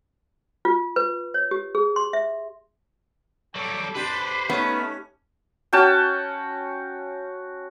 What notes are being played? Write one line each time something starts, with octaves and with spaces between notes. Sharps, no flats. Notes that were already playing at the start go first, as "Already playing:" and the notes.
F4
B4
C#5
G4
G#4
C6
E5
F#3 G3 A4 D6
D4 G4 B4 C5 B5
A3 B3 C#4 D#4
C#4 F#4 G5 A5